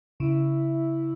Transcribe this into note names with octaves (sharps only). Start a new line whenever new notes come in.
C#3 E4